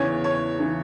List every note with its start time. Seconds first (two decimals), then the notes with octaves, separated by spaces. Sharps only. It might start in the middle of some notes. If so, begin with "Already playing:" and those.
Already playing: E2 C#3 E3 C#5
0.24 C#5
0.59 C#3 E3